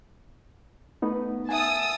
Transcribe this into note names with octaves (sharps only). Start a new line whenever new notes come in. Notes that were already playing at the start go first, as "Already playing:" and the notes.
A3 B3 D#4
E5 F#5 G#5 A5 D#6 E6